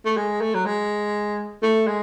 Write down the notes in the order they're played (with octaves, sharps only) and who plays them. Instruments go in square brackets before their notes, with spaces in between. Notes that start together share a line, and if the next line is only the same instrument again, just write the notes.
[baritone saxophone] A3
G#3
A3
F#3
G#3
A3
G#3